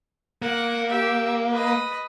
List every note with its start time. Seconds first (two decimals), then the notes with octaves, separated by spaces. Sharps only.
0.42 A#3 F#5
0.89 G4 E5
1.51 B4 D#5